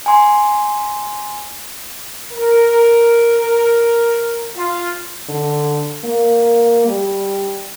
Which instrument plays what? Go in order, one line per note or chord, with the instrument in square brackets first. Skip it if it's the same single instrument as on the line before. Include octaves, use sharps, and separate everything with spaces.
[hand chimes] G#5 C6
[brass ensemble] A#4
F4
[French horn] D3
A#3
G3